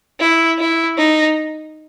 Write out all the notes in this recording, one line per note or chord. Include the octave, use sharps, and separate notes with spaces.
E4
E4
D#4